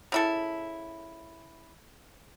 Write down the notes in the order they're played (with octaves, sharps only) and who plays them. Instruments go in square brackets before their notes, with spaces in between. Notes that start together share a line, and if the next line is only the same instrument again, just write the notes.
[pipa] C#3 E4 A4